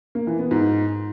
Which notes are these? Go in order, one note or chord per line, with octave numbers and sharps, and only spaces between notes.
A#3
E3
B3
G#2